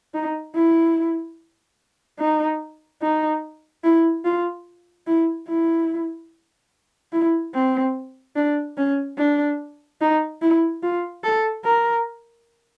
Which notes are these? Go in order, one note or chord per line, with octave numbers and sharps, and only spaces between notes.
D#4
E4
D#4
D#4
E4
F4
E4
E4
E4
C4
D4
C#4
D4
D#4
E4
F4
A4
A#4